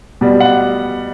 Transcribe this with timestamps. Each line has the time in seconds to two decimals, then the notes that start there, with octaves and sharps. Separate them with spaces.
0.21 B2 G3
0.40 F#5